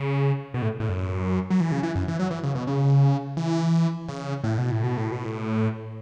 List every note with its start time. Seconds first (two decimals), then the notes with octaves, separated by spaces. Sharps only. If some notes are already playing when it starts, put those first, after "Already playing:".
Already playing: C#3
0.54 B2
0.62 A2
0.80 A2
0.89 F#2
1.50 F#3
1.60 E3
1.72 C#3
1.83 E3
1.95 F#2
2.08 E3
2.19 F#3
2.31 E3
2.44 C#3
2.55 B2
2.67 C#3
3.37 E3
4.08 C#3
4.44 A2
4.58 B2
4.71 A2
4.84 B2
4.97 A2
5.12 B2
5.25 A2